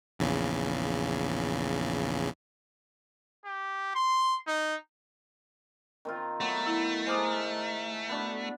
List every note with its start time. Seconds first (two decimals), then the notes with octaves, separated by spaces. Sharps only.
0.19 A#1 E2 C#3
3.45 G4
3.95 C6
4.47 D#4
6.05 D#3 C4 F4
6.40 F#3 A3 B3
6.66 E4
7.06 G#3 A#4 C5 D6 D#6
8.09 B3 D4 F#4